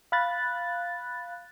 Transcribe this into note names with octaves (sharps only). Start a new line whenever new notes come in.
F5 B5 F#6 A6